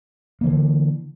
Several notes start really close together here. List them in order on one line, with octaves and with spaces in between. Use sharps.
A#3 E3 D3